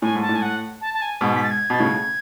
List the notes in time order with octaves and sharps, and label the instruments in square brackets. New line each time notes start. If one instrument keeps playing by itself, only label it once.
[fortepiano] A2 [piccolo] G#5
[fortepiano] G#2
[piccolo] A5
[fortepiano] A2
[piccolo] G#5
F#5
A5
A5
G#5
[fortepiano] G#2 B2
[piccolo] B6
A6
G#6
[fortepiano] B2 [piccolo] A6
[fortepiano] A2 C#3 [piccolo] G#6